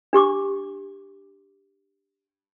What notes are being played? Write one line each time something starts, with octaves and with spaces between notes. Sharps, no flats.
D4 G4 C#6 D6